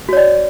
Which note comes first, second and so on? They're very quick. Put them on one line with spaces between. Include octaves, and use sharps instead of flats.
F#4 C#5 D5